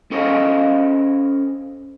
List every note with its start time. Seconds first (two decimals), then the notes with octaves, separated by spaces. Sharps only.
0.11 C#4 A4 C5 C#5 D#5 F5